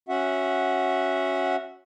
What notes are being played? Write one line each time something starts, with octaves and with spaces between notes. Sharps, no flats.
C#4 F#4 E5 F#5